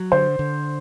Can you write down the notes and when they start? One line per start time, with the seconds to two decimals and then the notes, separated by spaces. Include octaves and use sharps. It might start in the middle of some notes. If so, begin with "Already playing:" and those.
Already playing: F#3
0.12 D3 C5
0.39 D3